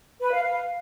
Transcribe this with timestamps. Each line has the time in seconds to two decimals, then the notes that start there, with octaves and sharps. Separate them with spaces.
0.21 B4
0.32 F5
0.44 F5